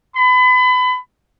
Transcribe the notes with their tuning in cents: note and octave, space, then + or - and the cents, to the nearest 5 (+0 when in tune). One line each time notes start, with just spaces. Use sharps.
B5 +30